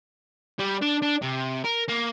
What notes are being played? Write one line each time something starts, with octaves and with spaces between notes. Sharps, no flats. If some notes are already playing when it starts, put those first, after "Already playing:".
G3
D4
D4
C3
A#4
A#3